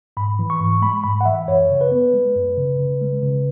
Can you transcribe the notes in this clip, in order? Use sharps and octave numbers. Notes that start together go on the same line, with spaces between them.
G#2 B5
E3
C#6
G#2
G#3 B5
G#2 B5
F#5
E3 E5
F#2 C#5
C#3
B4
B3
G#3
F#2
C#3
C#3
G#3
C#3